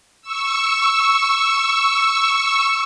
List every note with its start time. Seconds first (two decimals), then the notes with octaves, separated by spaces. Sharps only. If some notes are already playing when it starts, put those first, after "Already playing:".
0.22 C#6 E6